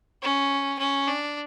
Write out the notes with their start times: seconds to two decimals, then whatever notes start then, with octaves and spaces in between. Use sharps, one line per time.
0.22 C#4
0.79 C#4
1.08 D4